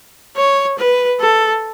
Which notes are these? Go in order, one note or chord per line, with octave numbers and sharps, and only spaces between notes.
C#5
B4
A4